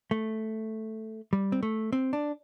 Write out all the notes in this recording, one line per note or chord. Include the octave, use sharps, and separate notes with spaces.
A3
G3
C4
A3
C4
D4